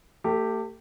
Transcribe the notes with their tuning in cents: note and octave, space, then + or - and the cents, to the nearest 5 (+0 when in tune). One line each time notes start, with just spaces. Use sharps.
A3 +30 G4 +0